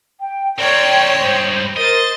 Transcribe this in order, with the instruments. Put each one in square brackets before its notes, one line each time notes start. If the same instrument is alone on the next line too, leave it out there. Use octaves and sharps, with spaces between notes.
[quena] G5
[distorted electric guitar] C4 A#4 [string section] C#5 G5 C6 [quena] D5
[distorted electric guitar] G2 G#3 [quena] C5
[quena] A#4 [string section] C5 A6 [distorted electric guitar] D#5